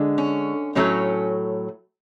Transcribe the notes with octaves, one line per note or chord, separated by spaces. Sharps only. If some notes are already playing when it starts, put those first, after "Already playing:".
Already playing: D3 G#3
C#4
A2 F#3 A3 C#4